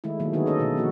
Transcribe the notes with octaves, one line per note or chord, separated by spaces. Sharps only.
D#3 G#3 A3 E4
D#3 F#3 A3 A#3
D3 D#3 B3 D#4 F#4 G#4
C#4 A4 D#5
B2 D3 A3
F3 A#3 F#4